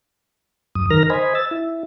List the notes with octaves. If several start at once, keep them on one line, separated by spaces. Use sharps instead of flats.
F#2 D#6
D#3 A#4 F6 A#6
C5 D#5 G#5 B5
E6 A6
E4